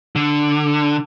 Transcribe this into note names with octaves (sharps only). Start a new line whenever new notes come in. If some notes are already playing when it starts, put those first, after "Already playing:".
D3